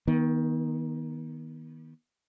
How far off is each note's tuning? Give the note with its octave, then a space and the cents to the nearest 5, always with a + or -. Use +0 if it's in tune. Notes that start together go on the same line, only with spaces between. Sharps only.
D#3 +20 B3 -30